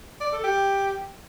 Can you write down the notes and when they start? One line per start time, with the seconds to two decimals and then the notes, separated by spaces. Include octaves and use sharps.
0.21 D5
0.32 A4
0.44 G4